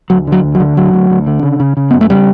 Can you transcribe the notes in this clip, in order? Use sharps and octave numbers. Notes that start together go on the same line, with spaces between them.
D2 F#3
D3 F#3
D2
F#3
D3
D2 F#3
D2
D2
D3
C#3
C#3
C#3
F#2 B3
A3
C#3 G3